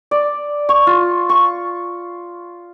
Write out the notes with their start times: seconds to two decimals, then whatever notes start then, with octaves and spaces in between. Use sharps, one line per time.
0.11 D5
0.69 C#6
0.87 F4
1.29 C#6